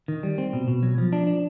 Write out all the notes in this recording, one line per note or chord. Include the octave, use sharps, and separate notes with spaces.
D#3
G3
C4
B2
B2
F#3
F3
D4
D4